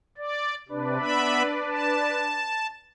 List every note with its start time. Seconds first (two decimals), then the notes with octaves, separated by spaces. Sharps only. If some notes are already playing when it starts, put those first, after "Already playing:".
0.17 D5
0.69 C3 D4 B4 D5
1.00 B3 E5 B5
1.70 A5